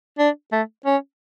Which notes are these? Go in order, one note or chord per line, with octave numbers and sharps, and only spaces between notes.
D4
A3
C#4